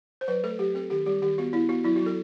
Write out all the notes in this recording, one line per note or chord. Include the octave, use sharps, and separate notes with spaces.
C5
F#3 B4
A3 A4
F#3 G4
C4 A4
D#3 G4
G3 G4
D#3 G4
B3 F#4
B3 E4
B3 F#4
F#3 E4
F#4
F#3 A4